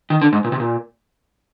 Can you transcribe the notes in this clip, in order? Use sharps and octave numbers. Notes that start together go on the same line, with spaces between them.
D#3
D3
G#2
A#2
C3
A#2